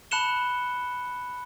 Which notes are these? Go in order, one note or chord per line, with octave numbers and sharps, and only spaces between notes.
A5 B5 F#6 C#7 E7 G7